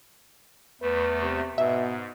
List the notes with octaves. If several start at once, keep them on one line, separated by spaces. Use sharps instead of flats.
E2 A3 B4
C3
G#2 B2 E5